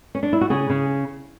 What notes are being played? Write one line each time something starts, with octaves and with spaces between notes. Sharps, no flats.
C#4
D4
E4
F#4
C#3 G#4
C#3